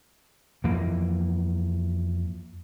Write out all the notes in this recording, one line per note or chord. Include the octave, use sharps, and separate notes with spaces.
F2 E3 A#3